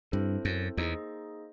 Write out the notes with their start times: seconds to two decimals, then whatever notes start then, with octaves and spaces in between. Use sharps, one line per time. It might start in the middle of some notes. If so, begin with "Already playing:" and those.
0.12 G2 C4 E4 A4 C5
0.45 F#2
0.77 E2 A#3 D#4 G#4 C5 D#5